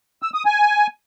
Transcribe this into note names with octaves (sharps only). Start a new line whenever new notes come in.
E6
D#6
G#5